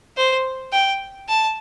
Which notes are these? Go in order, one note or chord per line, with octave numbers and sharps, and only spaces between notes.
C5
G5
A5